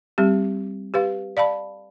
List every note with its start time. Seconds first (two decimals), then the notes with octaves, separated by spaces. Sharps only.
0.18 G3 C4 G4
0.94 G4 B4 F5
1.37 D5 F5 A5 B5